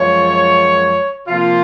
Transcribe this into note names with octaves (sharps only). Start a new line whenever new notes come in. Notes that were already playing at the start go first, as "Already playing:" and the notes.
Already playing: F#2 F3 G#3 C#5
C3 F3 A#3 F4